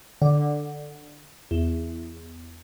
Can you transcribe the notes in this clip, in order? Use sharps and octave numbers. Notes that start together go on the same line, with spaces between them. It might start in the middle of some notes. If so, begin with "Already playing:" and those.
D3
E2